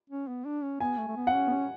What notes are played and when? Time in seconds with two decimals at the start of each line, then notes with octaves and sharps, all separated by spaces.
0.10 C#4
0.28 B3
0.45 D4
0.63 C#4
0.80 B3 G#5
0.98 A3
1.08 A3
1.16 B3
1.27 F#5
1.34 C#4
1.47 B3
1.50 C#4